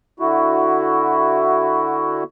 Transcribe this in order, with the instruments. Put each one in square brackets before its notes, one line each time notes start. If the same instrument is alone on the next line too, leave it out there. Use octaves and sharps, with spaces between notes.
[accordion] D3 E4 F#4